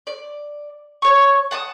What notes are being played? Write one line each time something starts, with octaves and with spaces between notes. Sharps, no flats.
D5
C#5 C#6
F#5 A5 C#6 D#6